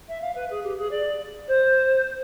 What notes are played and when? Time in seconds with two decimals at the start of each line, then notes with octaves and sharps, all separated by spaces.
0.08 E5
0.21 F5
0.35 B4
0.50 G#4
0.64 G4
0.78 G#4
0.91 D5
1.48 C5